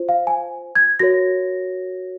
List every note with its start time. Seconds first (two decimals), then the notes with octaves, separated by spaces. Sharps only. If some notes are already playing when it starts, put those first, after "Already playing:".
Already playing: F4 C5
0.09 F5
0.27 G#5
0.75 G#6
0.99 F#4 A#4 C#5 A#6